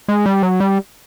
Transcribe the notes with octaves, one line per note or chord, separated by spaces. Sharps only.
G#3
G3
F#3
G3